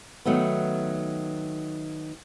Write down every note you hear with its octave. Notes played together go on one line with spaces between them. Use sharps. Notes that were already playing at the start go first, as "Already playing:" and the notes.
D#3 F#3 A3 B3